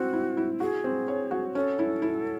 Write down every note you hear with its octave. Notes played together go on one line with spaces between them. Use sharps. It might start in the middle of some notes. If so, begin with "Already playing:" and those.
Already playing: C4 E4 F#4
E4
E4
F#4 G#4
C4
C#5
F#4
C#4 A4
E4
E4